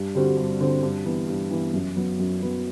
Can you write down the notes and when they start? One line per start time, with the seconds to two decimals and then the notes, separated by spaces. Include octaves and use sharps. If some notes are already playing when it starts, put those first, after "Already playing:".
Already playing: G2
0.15 D3 G3 C4 F#4
0.37 G2
0.60 D3 G3 C4 F#4
0.83 G2
1.05 E3 B3
1.28 G2
1.51 E3 B3
1.74 F#2
1.96 F#3 B3 F#4
2.19 F#2
2.41 F#3 B3 F#4